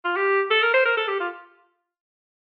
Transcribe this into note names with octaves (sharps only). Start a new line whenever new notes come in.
F4
G4
A4
A#4
C5
A#4
A4
G4
F4